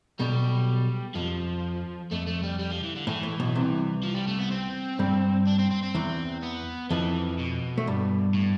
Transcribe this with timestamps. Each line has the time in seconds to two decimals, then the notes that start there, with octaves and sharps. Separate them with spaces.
0.19 B1 B2 G3
1.15 F2 F3
2.11 F2 A3
2.27 A3
2.43 G3
2.59 G3
2.71 F3
2.83 E3
2.96 D3
3.07 A2 E3
3.23 A2
3.40 B1 B2
3.55 C2 C3
4.03 F3
4.15 G3
4.27 A3
4.39 B3
4.51 C4
4.99 G2 G3
5.47 D4
5.59 C4
5.71 C4
5.83 C4
5.95 E2 E3
6.42 B3
6.90 F2 E3 F3
7.39 B2
7.78 A3
7.87 G2 G3
8.34 A2